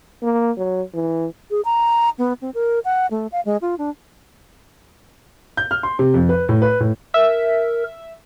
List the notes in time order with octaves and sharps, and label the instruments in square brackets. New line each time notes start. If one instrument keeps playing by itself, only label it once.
[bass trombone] A#3
F#3
E3
[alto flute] G#4
A#5
B3
C4
A#4
F#5
A3
F5
G#3
F4
D4
[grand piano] G6
F6
C6
C3
F2
B4
A2
B4
A2
[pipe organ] A#4 [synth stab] E5